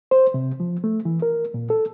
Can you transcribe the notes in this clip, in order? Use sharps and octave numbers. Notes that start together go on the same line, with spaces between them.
C5
C3
F3
A3
E3
A#4
A#2
A4